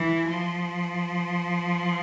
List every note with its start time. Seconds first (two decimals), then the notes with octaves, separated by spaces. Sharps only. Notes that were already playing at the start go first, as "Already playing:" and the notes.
Already playing: E3
0.28 F3